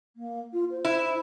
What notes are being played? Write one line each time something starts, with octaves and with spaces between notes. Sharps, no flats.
A#3
F4
C5
E4